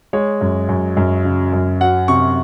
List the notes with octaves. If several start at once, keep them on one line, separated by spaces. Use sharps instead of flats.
G#3 C#5
F#2
F#2
F#2
C#3
F#2
F#3 F#5
C3 C#6